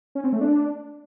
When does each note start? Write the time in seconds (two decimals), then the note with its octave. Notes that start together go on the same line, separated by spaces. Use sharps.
0.15 C#4
0.24 C4
0.32 A3
0.41 D4